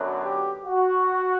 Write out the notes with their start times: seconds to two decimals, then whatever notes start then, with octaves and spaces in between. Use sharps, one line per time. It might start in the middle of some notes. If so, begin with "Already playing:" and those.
Already playing: F#2 D3 F#3 B3
0.22 G4
0.65 F#4